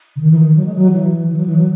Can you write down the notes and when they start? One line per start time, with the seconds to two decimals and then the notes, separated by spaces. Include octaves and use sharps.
0.16 C#3
0.20 D#3
0.31 E3
0.38 D#3
0.56 F#3
0.65 G#3
0.74 F#3
0.91 E3
1.27 E3
1.36 F#3
1.46 E3
1.56 F#3